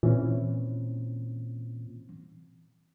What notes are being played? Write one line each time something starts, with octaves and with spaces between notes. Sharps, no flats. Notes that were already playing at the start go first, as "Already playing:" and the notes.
A#2 E3 C4 C#4